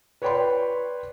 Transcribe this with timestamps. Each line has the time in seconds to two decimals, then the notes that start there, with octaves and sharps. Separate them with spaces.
0.22 B4 C#5 D5 G5 B5 C6